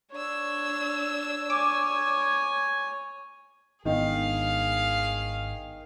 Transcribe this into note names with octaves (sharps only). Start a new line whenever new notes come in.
D4 C#5 E6
C#5 G#5 D6
G#1 D#3 B3 D4 G#4 F5